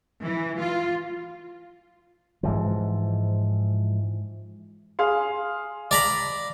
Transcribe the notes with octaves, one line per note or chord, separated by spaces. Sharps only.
E3
F4
G#2 E3 F3
G#4 F5 C6
D5 A#5 B5